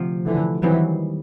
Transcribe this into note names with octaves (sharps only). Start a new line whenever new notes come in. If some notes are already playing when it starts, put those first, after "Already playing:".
Already playing: D2 C3 F3
D3 E3
D#2 D#3 E3 F#3 G3 C4